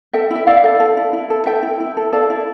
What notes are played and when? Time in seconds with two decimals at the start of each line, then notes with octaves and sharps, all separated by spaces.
0.13 A4 E5 G5
0.31 E4 E5
0.47 E4 D5 F5
0.64 A4
0.80 A4
0.97 E4
1.13 E4
1.30 A4
1.46 A4 E5 G5
1.63 E4
1.80 E4
1.97 A4
2.13 A4 D5 F5
2.30 E4